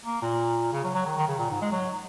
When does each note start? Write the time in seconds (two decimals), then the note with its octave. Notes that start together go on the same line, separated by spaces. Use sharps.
0.06 A#3
0.22 A#2
0.73 C#3
0.84 F#3
0.95 F#3
1.06 D#3
1.17 D#3
1.28 C#3
1.39 A#2
1.51 G#2
1.62 G#3
1.72 F#3